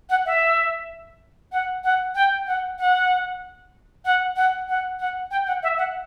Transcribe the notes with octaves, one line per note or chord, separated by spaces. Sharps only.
F#5
E5
F#5
F#5
G5
F#5
F#5
F#5
F#5
F#5
F#5
G5
F#5
E5
F#5